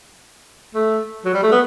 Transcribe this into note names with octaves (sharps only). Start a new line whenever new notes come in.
A3
F#3
G3
A3
B3